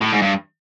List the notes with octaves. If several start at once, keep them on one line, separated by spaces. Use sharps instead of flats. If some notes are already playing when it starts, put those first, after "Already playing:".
A2
G#2
G2